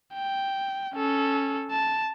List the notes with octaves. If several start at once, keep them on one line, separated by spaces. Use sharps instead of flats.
G5
C#4 A4
A5